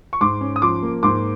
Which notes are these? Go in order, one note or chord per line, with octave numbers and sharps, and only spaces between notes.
C#6
G#2 C6 D6
C#4
D#6
F3 C6 D6
A#3
G#2 C6 D6